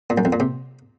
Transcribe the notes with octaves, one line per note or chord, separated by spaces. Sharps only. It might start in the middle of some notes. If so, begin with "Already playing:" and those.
A#2
F#2
F2
A#2
C3